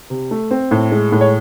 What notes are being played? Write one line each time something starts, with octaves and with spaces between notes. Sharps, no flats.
C3
A3
C4
A2
G#3
A2
C#5